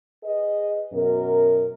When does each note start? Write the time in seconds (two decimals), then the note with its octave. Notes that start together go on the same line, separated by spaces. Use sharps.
0.24 G#4 B4 D#5
0.93 F#2 B2 A#4